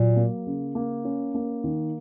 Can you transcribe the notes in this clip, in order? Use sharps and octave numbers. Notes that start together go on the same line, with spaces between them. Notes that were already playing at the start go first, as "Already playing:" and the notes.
Already playing: A#2 F#3
A#3
C#3
A#3
C#4
A#3
D#3